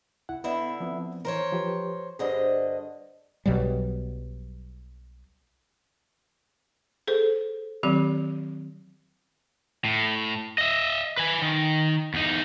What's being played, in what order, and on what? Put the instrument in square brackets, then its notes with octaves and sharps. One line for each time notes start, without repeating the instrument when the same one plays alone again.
[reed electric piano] C2 E4 F#5
[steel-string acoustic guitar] D3 E4 E5 [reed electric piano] B3
[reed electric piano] F3 B3 C4
[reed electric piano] E3 [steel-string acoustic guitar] A#4 C5 C#5
[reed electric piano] F3 G4 B4
[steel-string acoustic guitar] G2 D3 D#5 [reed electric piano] G#4 [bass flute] C5
[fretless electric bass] B1 B2 F#3 G3
[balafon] G#4 A4 C5
D#3 F#3 C4 G4 D5
[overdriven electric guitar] A2
D#5 E5
B4 G#5
D#3
E2 D#4